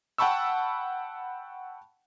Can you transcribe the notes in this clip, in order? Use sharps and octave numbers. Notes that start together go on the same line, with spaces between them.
F#5 G5 A5 B5 C#6 E6